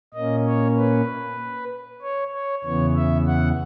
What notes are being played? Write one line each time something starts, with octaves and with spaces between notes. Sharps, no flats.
A#2 A#3 C#4 D#5
C#5
B4
C#5
C#5
E2 C#3 E3 B3 C#5
E5
F#5